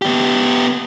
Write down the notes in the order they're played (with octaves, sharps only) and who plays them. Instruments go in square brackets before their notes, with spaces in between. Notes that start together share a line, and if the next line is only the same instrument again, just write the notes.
[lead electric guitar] B3 G4